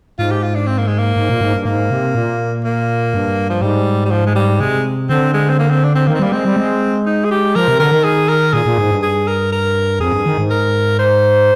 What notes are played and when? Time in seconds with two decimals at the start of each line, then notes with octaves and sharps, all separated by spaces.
0.19 G#2 F4
0.31 G4
0.43 F4
0.55 D4
0.67 C4
0.78 A#3
0.88 G#3
0.98 A#3
1.16 G#2
1.30 A#2
1.41 G#2
1.54 G2
1.65 G#2 A#3
1.91 C3
2.15 A#2
2.65 A#3
3.14 G2
3.50 F3
3.62 G#2 G3
4.05 G3
4.11 F3
4.26 G#3
4.35 G3
4.60 C3 G#3
5.09 D3 C4
5.34 G#3
5.50 C4
5.59 A#3
5.70 C4
5.84 D4
5.95 C4
6.07 D#3 A#3
6.15 C4
6.20 G3 A#3
6.32 G#3 C4
6.45 G3
6.57 G#3
7.06 D#4
7.25 G#4
7.31 G4
7.56 F3 A#4
7.68 C3
7.80 D3 A#4
7.91 D#3
8.04 G#4
8.29 A#4
8.53 A#2 G#4
8.66 A#2
8.78 G#2
8.91 G2
9.03 G#4
9.28 A#4
9.52 A#4
10.00 F2 G#4
10.13 G2
10.26 D#3
10.38 G#2
10.50 A#4
10.99 C5